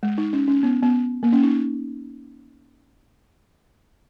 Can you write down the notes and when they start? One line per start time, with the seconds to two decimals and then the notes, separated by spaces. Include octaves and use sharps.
0.03 G#3
0.18 D#4
0.33 C#4
0.48 C#4
0.63 B3
0.83 B3
1.23 A#3
1.33 C#4
1.43 D#4